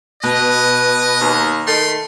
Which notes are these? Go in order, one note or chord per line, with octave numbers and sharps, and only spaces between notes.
B2 B4 D#5
D#2
D#3 A3 B5 C6